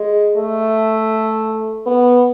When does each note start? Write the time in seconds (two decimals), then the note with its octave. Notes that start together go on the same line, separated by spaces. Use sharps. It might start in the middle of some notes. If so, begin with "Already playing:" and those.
Already playing: G#3
0.37 A3
1.86 B3